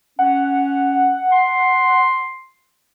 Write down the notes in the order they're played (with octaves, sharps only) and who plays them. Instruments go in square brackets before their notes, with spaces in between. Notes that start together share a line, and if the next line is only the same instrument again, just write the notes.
[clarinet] C#4 [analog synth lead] F#5
[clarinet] C6